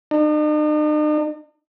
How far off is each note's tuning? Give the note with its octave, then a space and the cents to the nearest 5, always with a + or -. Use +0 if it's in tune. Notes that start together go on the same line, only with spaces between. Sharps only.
D#4 -45